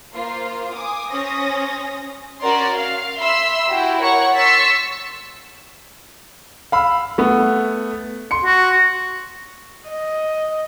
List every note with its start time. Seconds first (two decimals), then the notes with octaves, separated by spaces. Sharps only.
0.13 A#3 F4 C5
0.73 G#5 D6 D#6
1.11 C#4 C5 D#6 A#6
2.41 C#4 F#4 A#4 D5 C6
2.74 F5
3.18 E5 B5 C6 E6
3.69 E4 F#4 G4
4.01 A#4 C#5 F#5 C#6
4.35 C6 C#6 E6 A6 B6
6.72 F5 B5 E6
7.18 A3 B3
8.31 C6 C#7
8.45 F#4
9.87 D#5